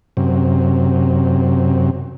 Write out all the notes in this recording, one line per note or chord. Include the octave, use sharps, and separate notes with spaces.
F#2 C3